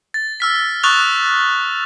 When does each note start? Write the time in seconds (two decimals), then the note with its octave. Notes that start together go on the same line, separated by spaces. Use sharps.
0.14 A6
0.40 E6 F6 B6
0.83 C#6 D#6 F6 F#6 A6 F7